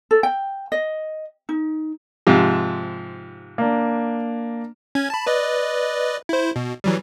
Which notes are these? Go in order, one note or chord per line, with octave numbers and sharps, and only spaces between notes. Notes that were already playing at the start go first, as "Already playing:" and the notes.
A4
G5
D#5
D#4
G#2 C3 F3
A#3 D4
C#4 G#6
A5 B5
B4 D5 D#5
E4 C5
B2
E3 F#3 G3